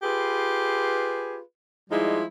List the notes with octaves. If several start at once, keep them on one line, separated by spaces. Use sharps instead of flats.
F4 G4 G#4 B4
F3 G3 G#3 D#4 E4